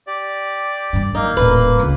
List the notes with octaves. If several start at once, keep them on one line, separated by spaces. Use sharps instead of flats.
G4 D5
G2 D#3
F#3 A#3 D#4
D#1 A2 B4
C#2 D#4